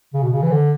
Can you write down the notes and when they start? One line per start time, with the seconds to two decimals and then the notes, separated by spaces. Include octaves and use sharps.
0.14 C#3
0.23 B2
0.33 C#3
0.42 E3
0.52 D3